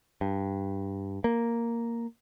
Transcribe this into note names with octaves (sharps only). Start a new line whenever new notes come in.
G2
A#3